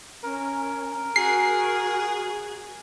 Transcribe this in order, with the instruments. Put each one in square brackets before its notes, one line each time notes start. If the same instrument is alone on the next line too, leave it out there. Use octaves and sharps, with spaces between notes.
[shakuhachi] C#4 [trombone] A#4
[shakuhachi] F#4 [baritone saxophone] G#4 [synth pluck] C7